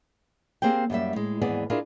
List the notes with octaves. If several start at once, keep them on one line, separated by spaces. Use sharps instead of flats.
A#3 C4 G4 G#4 G5
F#2 G3 A#3 E5
A2 G#3
D#2 G#2 E3 B3 G#4 D5
D4 E4 F4 G#4 A#4